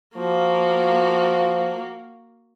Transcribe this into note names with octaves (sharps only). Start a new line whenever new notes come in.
F3 A#3 F#4